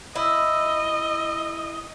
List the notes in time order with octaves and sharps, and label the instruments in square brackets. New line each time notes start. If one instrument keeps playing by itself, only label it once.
[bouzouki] E4 [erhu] D#5